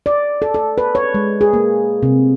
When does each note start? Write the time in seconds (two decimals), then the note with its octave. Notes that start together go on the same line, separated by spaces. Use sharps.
0.06 D5
0.42 A4
0.54 A4
0.78 B4
0.95 C#5
1.14 G#3
1.41 G#4
1.53 A#3
2.03 C3